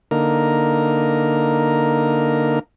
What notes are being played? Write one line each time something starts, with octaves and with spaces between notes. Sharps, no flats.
D3 A#3 D#4 A#4